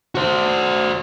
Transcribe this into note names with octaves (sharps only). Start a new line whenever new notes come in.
F#4 C5